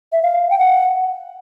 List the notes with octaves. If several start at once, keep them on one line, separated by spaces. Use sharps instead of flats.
E5
F5
G5
F#5